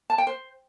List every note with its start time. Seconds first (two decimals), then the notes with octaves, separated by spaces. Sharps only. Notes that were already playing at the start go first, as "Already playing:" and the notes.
0.10 A5
0.18 G5
0.27 C5